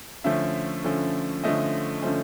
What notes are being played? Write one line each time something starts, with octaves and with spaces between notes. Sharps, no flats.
D3 F3 A3 C#4 E5
D3 F3 A3 C#4
D3 F3 A3 C#4 D#5
D3 F3 A3 C#4 C5